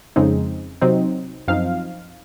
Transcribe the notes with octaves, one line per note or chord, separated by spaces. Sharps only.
F2 C#3 G#3 C4 D#4
C3 F#3 C4 D#4
F#2 F3 C4 D#4 F5